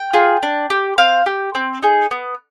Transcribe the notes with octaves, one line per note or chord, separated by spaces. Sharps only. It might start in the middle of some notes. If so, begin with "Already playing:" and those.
Already playing: G5
F4 G#4
D4
G4
C4 F5
G4
C4
D#4 G#4
B3